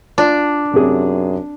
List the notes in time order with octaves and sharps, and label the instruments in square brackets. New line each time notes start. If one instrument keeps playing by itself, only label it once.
[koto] D4 [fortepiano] F4 D5
[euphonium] F#2 [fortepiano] C3 G#4